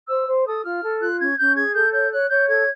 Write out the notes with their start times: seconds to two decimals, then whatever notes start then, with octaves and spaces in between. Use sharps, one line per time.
0.09 C5 E6
0.27 C5
0.45 A4 D#6
0.64 F4 F6
0.83 A4
1.00 F4 F#6
1.20 C#4 G#6
1.38 C#4 G6
1.56 G#4 G#6
1.74 A4 G6
1.92 C#5 G6
2.11 C#5 F#6
2.29 C#5 G6
2.48 A4 G#6